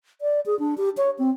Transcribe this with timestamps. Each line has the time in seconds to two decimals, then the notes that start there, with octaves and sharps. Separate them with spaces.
0.21 D5
0.46 G#4
0.59 D4
0.78 G4
0.97 C#5
1.19 C4